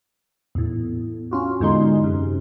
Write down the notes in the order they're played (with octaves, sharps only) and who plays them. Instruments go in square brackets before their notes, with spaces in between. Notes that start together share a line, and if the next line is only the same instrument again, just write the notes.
[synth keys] E2 A2
C#4 F4 F#4
E2 G#2 D3 G#3 D#4 C6
F#2 C3